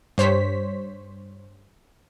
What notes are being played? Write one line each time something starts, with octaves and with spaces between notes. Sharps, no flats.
G2 C5 C#5 B6